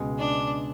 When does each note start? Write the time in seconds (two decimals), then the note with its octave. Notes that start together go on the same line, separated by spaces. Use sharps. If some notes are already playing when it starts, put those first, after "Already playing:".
Already playing: C#2 B2 G#3
0.18 D4